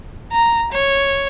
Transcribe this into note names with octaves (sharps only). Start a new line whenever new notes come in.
A#5
C#5